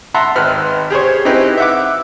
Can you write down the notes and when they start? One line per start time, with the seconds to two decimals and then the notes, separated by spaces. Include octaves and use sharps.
0.14 E5 F#5 A5 A#5 C6
0.35 G#1 B4 F6 F#6
0.90 G4 G#4 C5 C#5
1.25 C4 D#4 E4 G4 B4
1.58 E5 F#5 D6